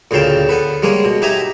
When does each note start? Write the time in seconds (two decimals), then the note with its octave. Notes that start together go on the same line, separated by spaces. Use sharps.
0.11 D2 A#2 C#3 F5 G5 A5
0.49 B3 A4 B4
0.83 G3 G#3 A#3 C#4
1.05 B2
1.22 D#4 G4 E5 G#5 A#5